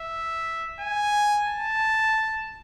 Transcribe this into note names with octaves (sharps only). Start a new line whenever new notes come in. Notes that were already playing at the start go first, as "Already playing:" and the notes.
Already playing: E5
G#5
A5